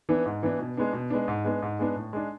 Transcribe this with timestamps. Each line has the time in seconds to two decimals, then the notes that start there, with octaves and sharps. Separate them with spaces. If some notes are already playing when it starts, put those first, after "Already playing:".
0.09 E3 B3 D4
0.26 G#2
0.43 E3 B3 D4
0.59 B2
0.77 G#3 B3 D4
0.93 B2
1.10 G#3 B3 D4
1.28 G#2
1.44 G#3 B3 D4
1.62 G#2
1.79 G#3 B3 D4
1.96 A2
2.13 G#3 D4